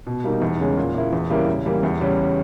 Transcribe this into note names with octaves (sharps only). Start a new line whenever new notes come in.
B2
G3 A#3 D#4
E2
C#3 G#3 C#4
A#2
A#3 E4
E2
C#3 G3 A#3 E4
C#3
E3 G3 A#3
E2
C#3 G3 C#4